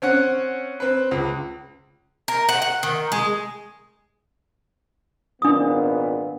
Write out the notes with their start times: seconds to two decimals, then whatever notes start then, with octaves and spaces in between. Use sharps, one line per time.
0.02 C4 C#4 F#5
0.80 C4 B4
1.11 C#2
2.28 A#4
2.49 F#5
2.62 F#5
2.83 D#3
3.12 G#3
5.42 G#1 A#2 B3 D4 D#6